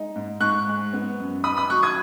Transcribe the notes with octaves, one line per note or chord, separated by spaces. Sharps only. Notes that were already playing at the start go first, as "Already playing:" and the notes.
Already playing: G#3 D#4
G#2
G#2 C#6 F#6
G#3
B3
F#2
D#4 B5 D#6
B5 D#6
F#3 C#6 F#6
D#6 G#6